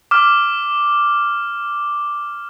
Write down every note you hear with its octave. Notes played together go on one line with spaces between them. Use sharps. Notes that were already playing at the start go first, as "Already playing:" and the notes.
D6 F6